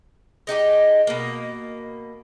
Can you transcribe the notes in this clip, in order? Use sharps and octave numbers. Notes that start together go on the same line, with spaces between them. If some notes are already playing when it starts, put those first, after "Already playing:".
G#3 D#4 F#4 G4
B2 A#3